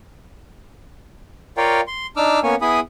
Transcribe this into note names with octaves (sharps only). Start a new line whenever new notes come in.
F4 A#4 C#5 D5 F5 G5
C6
D4 D#4 D6 E6 F6
A#3 B3 C#4 C#5 G#5
B3 E4 G#4 G#5 B5 D#6